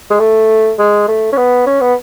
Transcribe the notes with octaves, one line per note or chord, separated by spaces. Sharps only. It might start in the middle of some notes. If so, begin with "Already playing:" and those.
G#3
A3
G#3
A3
C#4
B3
C#4
B3